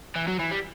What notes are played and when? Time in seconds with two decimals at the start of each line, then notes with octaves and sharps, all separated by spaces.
0.15 E3
0.28 F#3
0.39 E3
0.51 G3